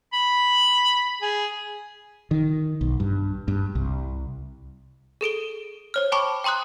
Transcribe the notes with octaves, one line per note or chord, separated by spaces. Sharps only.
B5
G#4
D#3
B1
G2
G2
C2
G#4 A4 D7 G7
C5 C#5 F6
G5 A5 B5 C#6 D6
G5 A#5 C6 D#6 F#6